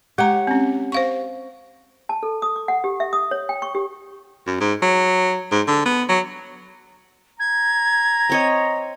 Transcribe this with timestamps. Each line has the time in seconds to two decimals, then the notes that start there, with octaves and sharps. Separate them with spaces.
0.18 G#3 G4 C#5 F#5 A#5
0.47 C4 C#4
0.92 C5 F5 C#6
2.09 A5
2.23 A4
2.42 D#6
2.56 D6
2.68 F#5
2.84 G4
3.00 E5
3.13 D#6
3.31 C#5
3.49 G5
3.62 C#6
3.75 G4
4.47 F#2
4.60 G#2
4.82 F#3
5.52 G#2
5.68 D3
5.86 B3
6.09 F#3
7.40 A#5 G#6
8.30 C4 C#5 D#5